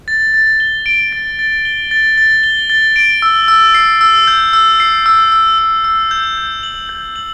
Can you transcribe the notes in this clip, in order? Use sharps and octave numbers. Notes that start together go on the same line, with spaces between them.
A6
A6
G7
D7
A6
A6
G7
A6
A6
G7
A6
D7
E6
E6
C7
E6
G6
E6
C7
E6
E6
E6
E6
G6
G6
F#7
G6
F#7